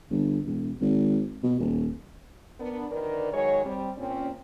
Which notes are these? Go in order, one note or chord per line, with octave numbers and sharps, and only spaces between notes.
G1
E1
G#1
B2
D#1
B3 D4 A#4
D2 D#3 A#4 B4 D5
D#3 F#3 G#3 C#5
G3 C4
A#2 C4 C#4